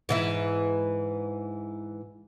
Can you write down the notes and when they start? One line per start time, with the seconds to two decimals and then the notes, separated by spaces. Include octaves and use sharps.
0.09 G#2 E3 E4